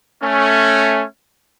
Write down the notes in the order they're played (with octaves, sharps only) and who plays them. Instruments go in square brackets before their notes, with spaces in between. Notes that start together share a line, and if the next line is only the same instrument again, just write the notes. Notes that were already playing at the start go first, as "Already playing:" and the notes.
[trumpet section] A3 C#4